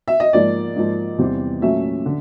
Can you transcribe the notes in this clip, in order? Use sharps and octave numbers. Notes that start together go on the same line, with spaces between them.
E5
D#5
G#2 F3 A#3 D5
G#2 F3 A#3
E2 C3 E3 G3 C4
A#2 F#3 A3 C#4 E5
D3